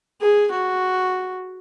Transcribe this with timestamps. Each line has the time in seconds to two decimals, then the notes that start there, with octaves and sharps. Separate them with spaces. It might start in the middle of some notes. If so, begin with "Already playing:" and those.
0.21 G#4
0.51 F#4